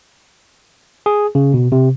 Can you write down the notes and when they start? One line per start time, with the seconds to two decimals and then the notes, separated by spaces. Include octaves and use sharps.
1.06 G#4
1.35 C#3
1.54 B2
1.72 C3